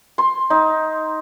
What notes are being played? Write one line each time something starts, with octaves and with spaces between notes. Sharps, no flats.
C6
D#4